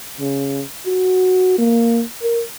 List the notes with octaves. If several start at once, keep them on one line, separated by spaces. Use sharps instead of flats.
C#3
F#4
A#3
A#4